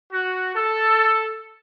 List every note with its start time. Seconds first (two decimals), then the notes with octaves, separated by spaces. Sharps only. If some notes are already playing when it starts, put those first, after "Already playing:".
0.12 F#4
0.55 A4